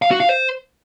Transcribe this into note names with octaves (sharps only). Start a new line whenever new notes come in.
F5
F#4
F5
C5